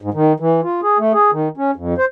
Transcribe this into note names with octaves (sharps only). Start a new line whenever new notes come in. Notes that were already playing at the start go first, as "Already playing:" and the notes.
G#2
D#3
E3
F4
G#4
A3
G#4
D#3
C#4
F2
C5